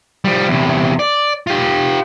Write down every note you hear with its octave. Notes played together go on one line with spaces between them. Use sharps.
F3 G3
E2 C3
D5
F4 G4